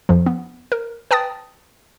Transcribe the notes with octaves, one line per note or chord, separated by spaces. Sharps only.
F2 F3
B3
A#4
B4 G5 A5 D#6 A6